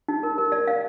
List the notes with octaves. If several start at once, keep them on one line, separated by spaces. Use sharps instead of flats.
D#4
A#4
A#4
D5
F5